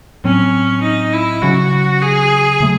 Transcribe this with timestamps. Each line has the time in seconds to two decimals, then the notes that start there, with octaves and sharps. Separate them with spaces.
0.24 A2 F#3 C4 C#4
0.83 D#4
1.13 E4
1.42 C#3 F#3 C#4 F#4
2.02 G#4
2.60 C#3 F#3 A3